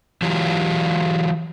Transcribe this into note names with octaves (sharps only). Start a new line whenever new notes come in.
E3 F#3 F4 G4